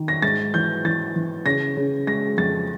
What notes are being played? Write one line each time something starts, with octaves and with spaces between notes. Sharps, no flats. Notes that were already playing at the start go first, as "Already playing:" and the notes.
Already playing: D#3
A#6
G#2 A6
E3 G6
E3 A6
E3
C#3 A#6
C#3
G#3 A#6
F2 A6